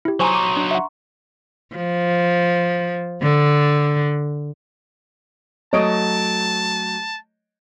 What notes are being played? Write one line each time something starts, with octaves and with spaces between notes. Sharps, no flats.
E4 G4
F#3 D#4 C5 G#5 A#5 C6 C#6
D6
D4
E5 F#5
F3
D3
F#3 A3 C#5 D#5 A5 D7